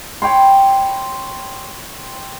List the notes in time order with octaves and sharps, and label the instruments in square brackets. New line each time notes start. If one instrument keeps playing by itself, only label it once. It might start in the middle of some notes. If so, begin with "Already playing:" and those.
[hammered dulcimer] C#5 G5 B5 C6